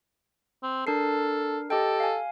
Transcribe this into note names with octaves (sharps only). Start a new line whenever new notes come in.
C4
D4 A4 A#4 C7
G4 A4 D#5 G5
F5 G#5